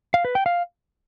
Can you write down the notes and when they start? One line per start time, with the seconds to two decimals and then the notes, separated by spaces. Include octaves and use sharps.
0.14 F5
0.25 B4
0.35 G5
0.46 F5